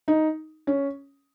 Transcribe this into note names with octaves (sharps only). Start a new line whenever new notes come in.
D#4
C#4